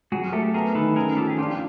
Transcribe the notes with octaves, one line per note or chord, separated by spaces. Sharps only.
F#3 F#4 G#4
A3 G4 A4
B3 G#4 A#4
D#3 A4 B4
C#4 G#4 A#4
F3 G4 A4
G#4
D4 F4 G4
F4